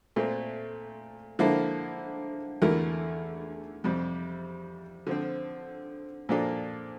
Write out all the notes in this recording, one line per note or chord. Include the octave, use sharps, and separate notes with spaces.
A#2 A3 C4
D3 F3 A#3 E4 A4
E2 D3 A3 E4 A#4
F2 C3 G3
D3 F3 C4
A#2 F3 A#3 D4 A4